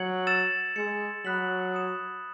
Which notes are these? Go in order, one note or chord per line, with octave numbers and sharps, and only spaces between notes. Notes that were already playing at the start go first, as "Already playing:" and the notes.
Already playing: F#3 G#6 C#7 F#7
E6 A6 E7
G#3 E6 G#6 C#7
F#3 B5 D#6 F#6 B6 F#7
D#6 G#6 C#7 E7